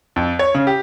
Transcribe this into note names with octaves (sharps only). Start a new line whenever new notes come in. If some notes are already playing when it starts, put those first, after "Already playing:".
F2
C#5
C#3
G4